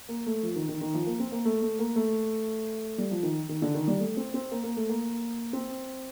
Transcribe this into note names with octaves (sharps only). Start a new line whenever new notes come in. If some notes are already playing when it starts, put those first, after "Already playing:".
A#3
A3
F3
D#3
D#3
D#3
F3
A#3
C4
A#3
A3
A3
A#3
A3
G3
F3
D#3
D#3
D3
D#3
G3
A3
C4
C4
A#3
A#3
A3
A#3
C4